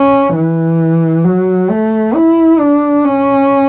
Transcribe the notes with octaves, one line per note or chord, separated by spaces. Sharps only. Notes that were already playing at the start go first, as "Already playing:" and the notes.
Already playing: C#4
E3
F#3
A3
E4
D4
C#4